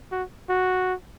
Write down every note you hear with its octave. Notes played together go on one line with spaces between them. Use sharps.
F#4
F#4